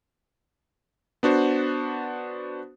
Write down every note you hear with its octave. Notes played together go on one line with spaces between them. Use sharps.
B3 D4 F#4 C5